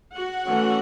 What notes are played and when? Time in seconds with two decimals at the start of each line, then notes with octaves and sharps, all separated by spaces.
0.16 F#4 F#5
0.45 E3 A3 C#4